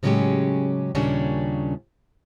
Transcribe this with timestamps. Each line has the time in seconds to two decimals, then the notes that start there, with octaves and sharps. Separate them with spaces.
0.03 A2 C#3 F#3 G#3 C#4 G4
0.95 D#2 A#2 C#3 G3 C#4 D4